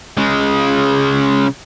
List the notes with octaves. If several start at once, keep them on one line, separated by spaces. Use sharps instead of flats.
C#3 G#3